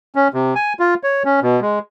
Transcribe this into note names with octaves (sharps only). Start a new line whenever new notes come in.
C#4
C3
G#5
F4
C#5
C#4
B2
G#3